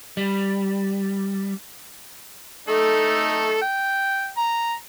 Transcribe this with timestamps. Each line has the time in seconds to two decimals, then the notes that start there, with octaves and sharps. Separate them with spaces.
0.17 G3
2.68 A3 D#4 A4
3.61 G5
4.37 A#5